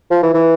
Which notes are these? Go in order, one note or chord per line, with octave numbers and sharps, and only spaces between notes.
F3
E3
E3